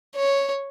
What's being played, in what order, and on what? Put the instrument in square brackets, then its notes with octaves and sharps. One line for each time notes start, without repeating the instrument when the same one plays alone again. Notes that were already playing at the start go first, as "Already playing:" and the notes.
[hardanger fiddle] C#5